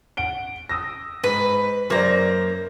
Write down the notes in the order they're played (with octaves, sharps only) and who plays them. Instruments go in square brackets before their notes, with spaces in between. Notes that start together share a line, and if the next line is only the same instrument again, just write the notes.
[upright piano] F#5 D7 G7
D#6 E6 A#6
[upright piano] G#2 [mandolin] B4
[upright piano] F#2 C5 D5 [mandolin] A#3 A#5